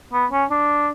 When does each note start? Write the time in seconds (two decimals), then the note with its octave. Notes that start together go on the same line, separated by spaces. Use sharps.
0.13 B3
0.31 C#4
0.50 D4